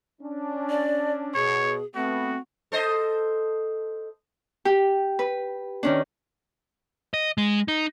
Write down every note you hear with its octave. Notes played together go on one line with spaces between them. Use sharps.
C#4 D4
D5
B2 G#4 C#5
A3 B3 C4 F#4
A4 C5 D#5
G4
B4
D#3 C#4 D4
D#5
G#3
D#4